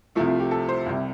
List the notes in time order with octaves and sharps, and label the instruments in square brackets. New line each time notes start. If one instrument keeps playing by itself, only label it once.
[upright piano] C2 C3 F3 A3 E4
F4
G4
A4
C5
C2 C3 G3